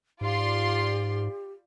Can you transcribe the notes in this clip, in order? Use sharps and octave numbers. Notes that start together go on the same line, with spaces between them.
G#2 F4 G4 D5 C6